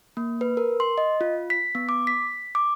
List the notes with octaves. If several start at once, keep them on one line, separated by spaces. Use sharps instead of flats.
A#3
B4
A#4
C6
D#5
F4
B6
B3
D6
B6
D6